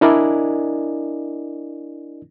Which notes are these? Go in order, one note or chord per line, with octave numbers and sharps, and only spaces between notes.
D4 E4 A#4 D5 D#5 G#5